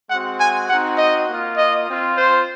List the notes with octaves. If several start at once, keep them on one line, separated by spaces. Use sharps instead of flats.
G#3 C4 F#4 F#5
G#5
C4 D#4 F#4 F#5
D#5
A#3 F4
D#5
C4 F4
C5